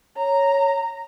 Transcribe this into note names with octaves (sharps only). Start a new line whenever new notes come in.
C#5 A#5